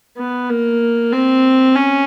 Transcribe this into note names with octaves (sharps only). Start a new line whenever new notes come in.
B3
A#3
C4
C#4